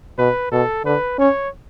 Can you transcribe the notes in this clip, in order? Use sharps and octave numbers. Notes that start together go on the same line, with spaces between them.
B2 B4
B2 A4
D3 B4
C#4 C#5